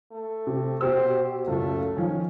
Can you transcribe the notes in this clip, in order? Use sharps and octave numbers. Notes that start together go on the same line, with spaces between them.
A3
C3
B2 G4 C5 E6
F#1 C#2 A3
D#3 F3 C#4